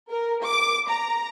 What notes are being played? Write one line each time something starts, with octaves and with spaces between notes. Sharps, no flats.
A#4
D6
A#5